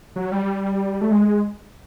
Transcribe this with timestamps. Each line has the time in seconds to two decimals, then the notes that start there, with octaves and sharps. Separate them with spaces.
0.16 F#3
0.31 G3
1.01 A3
1.11 G#3